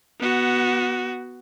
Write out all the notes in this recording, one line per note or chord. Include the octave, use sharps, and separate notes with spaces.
B3 F#4